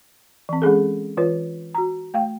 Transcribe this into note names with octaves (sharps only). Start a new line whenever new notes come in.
E3 C4
G#3 C#4 G#4 A4
E3 F4 B4 C#5
F#4 A#5
A3 F5 G5